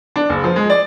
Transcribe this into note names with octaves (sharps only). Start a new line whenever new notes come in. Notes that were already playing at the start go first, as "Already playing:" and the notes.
D4
F#1
F3
G#3
D5